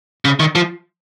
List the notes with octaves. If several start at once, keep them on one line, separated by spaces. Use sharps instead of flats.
C#3
D#3
F3